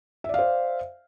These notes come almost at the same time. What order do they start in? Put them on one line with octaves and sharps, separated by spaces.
E5 D5 F5 C5